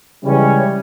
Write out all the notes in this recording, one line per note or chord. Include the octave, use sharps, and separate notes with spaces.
C#3 E3 G3 G#3 C#4